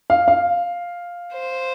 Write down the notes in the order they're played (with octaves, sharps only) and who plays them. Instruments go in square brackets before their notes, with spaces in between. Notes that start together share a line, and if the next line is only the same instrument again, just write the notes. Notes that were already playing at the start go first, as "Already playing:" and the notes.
[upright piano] F5
F5
[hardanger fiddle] C5